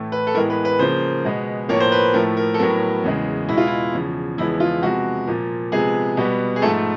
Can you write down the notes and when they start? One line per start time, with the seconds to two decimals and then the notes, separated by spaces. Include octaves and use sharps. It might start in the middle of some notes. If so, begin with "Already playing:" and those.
Already playing: A2 E3 A3
0.12 B4
0.27 A4
0.34 A2 E3 G#3 B3 A#4
0.50 B4
0.65 B4
0.79 C#3 F3 A#3 C5
1.25 B2 G#3 B3
1.69 A2 F3 A#3 C#5
1.80 C5
1.92 B4
2.14 A2 F3 A3 A#4
2.37 A#4
2.54 A4
2.59 A2 F#3 B3 A#4
3.04 E2 C#3 E3 G#3
3.48 B2 G#3 B3 E4
3.57 F4
3.67 E4
3.93 E2 C#3 F3
4.38 E2 C#3 F3 G#3 B3 E4
4.60 F4
4.82 C3 F3 G#3 B3 F#4
5.27 A#2 F3 A#3
5.72 C3 F3 G#3 B3 G#4
6.17 B2 G3 B3
6.56 G#4
6.62 G#2 F3 A3 A4